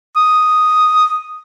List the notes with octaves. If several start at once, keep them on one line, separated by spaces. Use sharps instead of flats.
D#6